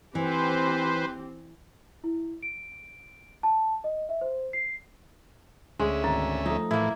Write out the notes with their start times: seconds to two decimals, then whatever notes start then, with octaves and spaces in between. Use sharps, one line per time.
0.15 E3 C4 G4 B4 C5
2.04 E4
2.42 D7
3.43 A5
3.84 D#5
4.09 E5
4.21 C5
4.53 C7
5.79 D2 G#3 C#4 G#4 E5
6.04 G#1 A#5 A6
6.46 F3 A3 D#4
6.71 A2 E3 A#3 E4